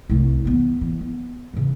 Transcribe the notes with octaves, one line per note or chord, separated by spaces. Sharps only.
C2 A3
E3 B3
E3
B3
C#3 E3